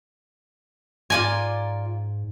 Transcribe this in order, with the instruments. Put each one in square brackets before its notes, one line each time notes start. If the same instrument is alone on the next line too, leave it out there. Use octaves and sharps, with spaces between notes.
[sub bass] G#2 [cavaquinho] F4 D5 A#5 [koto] G#5